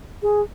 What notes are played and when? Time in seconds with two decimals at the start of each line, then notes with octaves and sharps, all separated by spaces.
0.23 G#4